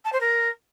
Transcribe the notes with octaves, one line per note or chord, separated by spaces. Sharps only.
A5
C5
A#4